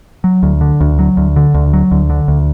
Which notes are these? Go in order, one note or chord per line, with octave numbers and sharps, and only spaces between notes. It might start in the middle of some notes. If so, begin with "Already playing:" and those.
F#3
D2
D3
D2
F#3
D2
D3
D2
F#3
D2
D3
D2